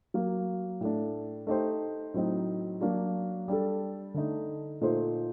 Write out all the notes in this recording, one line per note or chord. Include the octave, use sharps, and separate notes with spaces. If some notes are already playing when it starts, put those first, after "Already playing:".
F#3 A#3 F#4
A2 A3 D4
A3 D#4 G4 C5
A2 F#3 C4 D#4
F#3 A#3 D4 F#4
G3 D4 A4
D3 A3 D#4
A#2 A3 D#4 A4 C5